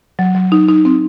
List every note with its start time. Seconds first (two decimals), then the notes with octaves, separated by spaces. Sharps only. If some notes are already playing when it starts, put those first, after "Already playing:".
0.19 F#3
0.35 F#3
0.52 D#4
0.69 D#4
0.85 C4